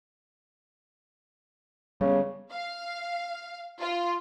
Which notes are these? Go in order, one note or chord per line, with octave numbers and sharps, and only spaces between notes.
C#3 G3 A3 B3
F5
F4